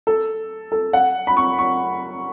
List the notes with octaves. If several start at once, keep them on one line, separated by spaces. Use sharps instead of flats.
A4
A4
F#5
B5
C#6
C#6